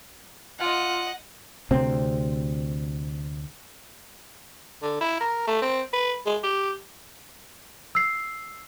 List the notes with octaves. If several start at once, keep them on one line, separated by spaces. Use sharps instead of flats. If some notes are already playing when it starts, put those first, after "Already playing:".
F4 D#5 F#5
D2 C3 C4
D3
E4
A#4
A3
C4
B4
G#3
G4
E6 C7